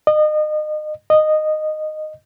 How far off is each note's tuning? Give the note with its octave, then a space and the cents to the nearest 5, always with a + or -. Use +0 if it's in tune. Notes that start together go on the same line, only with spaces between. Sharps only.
D#5 -30
D#5 -10